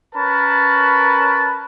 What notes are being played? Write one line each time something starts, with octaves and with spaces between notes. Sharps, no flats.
C#4 A#4 B4 A5 B5